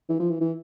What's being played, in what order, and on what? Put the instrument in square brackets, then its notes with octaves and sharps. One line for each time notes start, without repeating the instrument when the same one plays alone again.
[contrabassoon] E3
F3
E3
E3